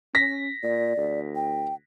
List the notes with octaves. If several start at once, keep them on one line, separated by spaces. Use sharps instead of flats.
C#4 A#6 B6
A#2 D5
D2
G5